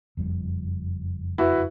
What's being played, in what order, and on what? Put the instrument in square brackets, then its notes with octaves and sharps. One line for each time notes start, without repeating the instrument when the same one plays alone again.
[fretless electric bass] F#1 F2 G3
[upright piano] E4 F#4 B4